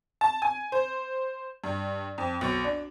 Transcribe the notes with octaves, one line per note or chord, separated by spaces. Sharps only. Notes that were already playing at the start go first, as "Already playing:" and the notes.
A5
G#5
C5
G2
F2
B1
D4